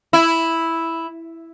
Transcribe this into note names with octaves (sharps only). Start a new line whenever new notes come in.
E4